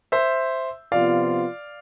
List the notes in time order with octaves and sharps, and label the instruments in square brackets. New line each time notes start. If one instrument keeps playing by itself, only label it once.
[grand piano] C5 E5
[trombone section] C3 F3 B3 F4 [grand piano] D5 F5